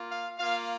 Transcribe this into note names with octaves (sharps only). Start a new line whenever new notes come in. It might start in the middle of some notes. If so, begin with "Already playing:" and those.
Already playing: A#3 F4
F5
A#3 F4 F5